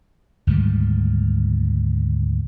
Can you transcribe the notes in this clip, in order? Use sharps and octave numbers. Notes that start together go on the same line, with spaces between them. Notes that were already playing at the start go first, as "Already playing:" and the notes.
D2 G#2 D#3 G3